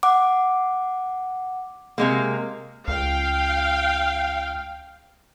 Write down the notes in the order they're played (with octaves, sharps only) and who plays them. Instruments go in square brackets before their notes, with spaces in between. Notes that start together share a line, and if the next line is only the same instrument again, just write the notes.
[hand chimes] F#5 D6
[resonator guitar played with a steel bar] C3 G#3 A#3
[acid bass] C#2 [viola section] F5 G5